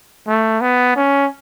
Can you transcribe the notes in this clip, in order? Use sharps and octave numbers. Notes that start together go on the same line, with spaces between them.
A3
B3
C#4